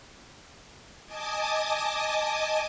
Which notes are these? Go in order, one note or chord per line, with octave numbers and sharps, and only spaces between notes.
D#5 G#5 A5 D6 D#6